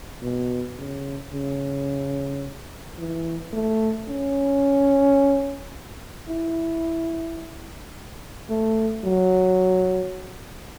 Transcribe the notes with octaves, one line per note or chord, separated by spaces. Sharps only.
B2
C#3
C#3
E3
A3
C#4
E4
A3
F#3